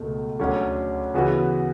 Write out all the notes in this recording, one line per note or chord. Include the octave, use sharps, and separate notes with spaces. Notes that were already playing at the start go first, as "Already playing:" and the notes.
Already playing: C#2 B2 A3
D2 D3 F#3 C#4
C#3 E3 B3 F#4